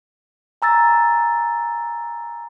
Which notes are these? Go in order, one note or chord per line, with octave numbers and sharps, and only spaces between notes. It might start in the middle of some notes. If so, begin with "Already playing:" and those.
G#5 A#5 E6 A6